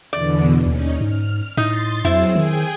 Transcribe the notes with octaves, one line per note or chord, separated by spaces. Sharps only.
E2 B2 D3 D5
D#2 C#4 D#4
G#2 F6
A2 D#4 C6 A6
F2 F#3 C4 E4 G#4 C5
D#3 G#4 G5 G#5